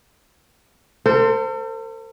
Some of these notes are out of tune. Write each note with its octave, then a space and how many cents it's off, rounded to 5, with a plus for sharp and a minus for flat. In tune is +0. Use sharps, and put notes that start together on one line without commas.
A4 +45 C5 -10